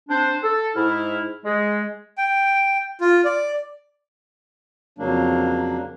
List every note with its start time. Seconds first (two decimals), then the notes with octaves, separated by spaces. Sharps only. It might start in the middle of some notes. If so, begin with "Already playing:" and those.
0.09 C4 D4 C5
0.43 A4
0.75 G#2 E4 F6
1.45 G#3
2.18 G5
3.01 F4
3.25 D5
4.98 F2 C#3 F#3 A#3 D4